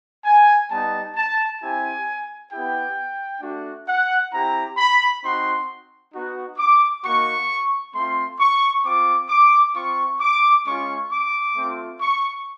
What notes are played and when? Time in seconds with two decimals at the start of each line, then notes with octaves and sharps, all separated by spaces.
0.25 G#5
0.70 G3 B3 D#4 A5
1.15 A5
1.61 C4 E4 G4 G#5
2.51 B3 E4 G4 G5
3.41 A3 D4 F#4
3.87 F#5
4.32 C4 E4 G4 A#5
4.77 B5
5.22 C4 D#4 F#4 C6
6.13 B3 D#4 F#4
6.58 D6
7.03 A#3 D#4 F#4 C#6
7.93 A3 C4 F4 C6
8.39 C#6
8.84 C4 F4 D6
9.29 D6
9.74 C4 F4 C#6
10.20 D6
10.65 G#3 C#4 F4 C#6
11.10 D6
11.55 A3 C4 F4
12.00 C#6